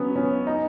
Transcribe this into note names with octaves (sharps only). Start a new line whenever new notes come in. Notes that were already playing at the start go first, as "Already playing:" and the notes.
Already playing: C#3 F#3 B3 C#4
C#2 C#4
D#4